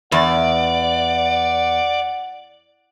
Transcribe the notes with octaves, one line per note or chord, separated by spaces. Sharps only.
E2 D5 F#5